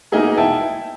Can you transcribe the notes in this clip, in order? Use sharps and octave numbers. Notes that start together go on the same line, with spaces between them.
A#3 B3 D#4 E4 G#4 A#4
E4 G5 A5